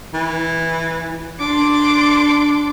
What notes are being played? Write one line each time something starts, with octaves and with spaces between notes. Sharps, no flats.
E3
D4 C6 D6